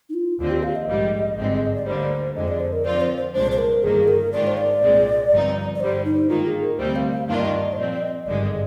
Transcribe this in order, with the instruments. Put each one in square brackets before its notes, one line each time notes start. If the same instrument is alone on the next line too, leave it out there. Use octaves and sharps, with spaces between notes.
[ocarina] D#4
F4
[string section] D#2 D3 F3 C4 [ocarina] F4
[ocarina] G4
F5
D#5
[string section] A#1 G#2 G3
G#1 G2 D3 G#3 C4
[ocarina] D5
[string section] D2 D3 G3 A#3 [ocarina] C5
[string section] F2 D3 G#3 [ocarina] D#5
[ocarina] D5
C5
A#4
[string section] F2 D3 F3 C4 F4 [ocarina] D5
[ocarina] C5
C5
[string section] C2 A#2 G#3 D4 [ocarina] C5
[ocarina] C5
A#4
[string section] G1 G2 D#3 A#3 [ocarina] G#4
[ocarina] A#4
[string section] G#2 D#3 G#3 D4 F4 [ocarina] D5
[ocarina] C5
D5
[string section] C2 A#2 G#3 C4
G1 G2 F3 C4 D#4
[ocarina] D5
[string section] G2 D3 G3 [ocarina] C5
[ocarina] D#4
[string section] G#2 D#3 A#3 [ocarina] F4
[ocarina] G#4
A#4
[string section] D2 C3 G3 C4 [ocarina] C5
[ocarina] F5
F5
[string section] G2 D#3 A#3 D4 F4 [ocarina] F5
[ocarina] D5
D#5
D5
D#5
C5
[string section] A#2 F3 C4 [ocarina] D5
[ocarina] D5
D#5
[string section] G#1 G2 D3 G#3 [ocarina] D5
[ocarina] D#5